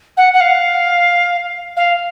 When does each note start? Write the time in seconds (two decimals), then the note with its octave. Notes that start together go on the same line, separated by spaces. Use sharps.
0.17 F#5
0.33 F#5
0.40 F5
1.76 F5